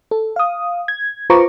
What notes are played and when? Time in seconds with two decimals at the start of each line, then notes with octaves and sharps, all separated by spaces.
0.11 A4
0.36 F5 D#6
0.88 G#6
1.30 F4 B4 C5 A#5 C#6 D6